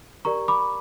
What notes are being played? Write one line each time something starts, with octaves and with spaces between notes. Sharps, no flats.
G4 A#4 D5 A#5 C#6
B5 D6